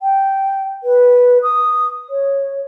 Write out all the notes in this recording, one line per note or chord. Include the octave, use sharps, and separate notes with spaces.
G5
B4
D#6
C#5